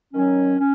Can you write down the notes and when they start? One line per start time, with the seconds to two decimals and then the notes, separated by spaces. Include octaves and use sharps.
0.13 D#3 F#3 C#4
0.60 C#4